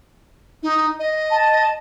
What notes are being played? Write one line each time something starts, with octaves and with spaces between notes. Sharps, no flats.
D#4
D#5
A5